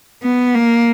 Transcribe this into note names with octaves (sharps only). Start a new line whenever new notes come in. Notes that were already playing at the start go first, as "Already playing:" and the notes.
B3
A#3